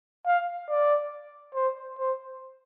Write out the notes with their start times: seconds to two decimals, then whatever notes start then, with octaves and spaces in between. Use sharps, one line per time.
0.26 F5
0.69 D5
1.55 C5
1.98 C5